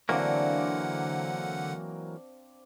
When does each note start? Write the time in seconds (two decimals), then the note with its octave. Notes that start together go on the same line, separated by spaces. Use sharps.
0.09 D3 E3 F#3 A#3 C4 D4 F5 F#5